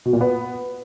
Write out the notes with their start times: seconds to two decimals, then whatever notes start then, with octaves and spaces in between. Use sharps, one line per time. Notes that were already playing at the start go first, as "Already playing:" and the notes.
0.05 B2
0.13 A#2
0.21 B3